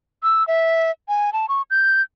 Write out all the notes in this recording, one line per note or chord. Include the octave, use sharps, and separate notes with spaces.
E6
E5
G#5
A5
C#6
G6